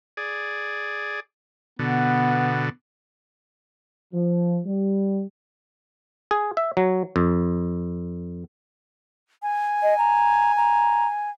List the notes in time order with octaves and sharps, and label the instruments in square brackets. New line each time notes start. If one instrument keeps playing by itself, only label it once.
[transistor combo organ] G#4 D5
[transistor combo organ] B2 D3 [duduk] B3
[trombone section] F3
G3
[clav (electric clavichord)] G#4
E5
F#3
F2
[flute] G#5
[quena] D#5
A#5
A#5